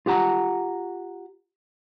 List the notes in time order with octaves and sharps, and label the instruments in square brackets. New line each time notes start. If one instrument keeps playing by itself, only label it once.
[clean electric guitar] F4 G4 F#5 A#5